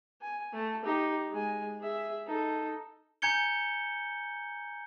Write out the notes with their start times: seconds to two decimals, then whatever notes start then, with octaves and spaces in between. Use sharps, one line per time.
0.22 G#5
0.52 A3 A5
0.84 D#4 G4
1.31 G#3 G#5
1.80 G#4 E5
2.27 D#4 A4
3.22 G#5 A#5 G6 G#6 C#7 G7